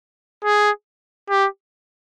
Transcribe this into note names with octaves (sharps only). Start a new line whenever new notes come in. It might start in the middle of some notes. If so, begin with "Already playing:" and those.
G#4
G4